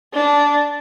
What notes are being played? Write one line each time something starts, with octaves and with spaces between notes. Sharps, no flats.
D4